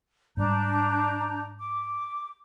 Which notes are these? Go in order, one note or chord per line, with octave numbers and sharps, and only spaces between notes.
G#2 G3 D4 A#5 G6
D6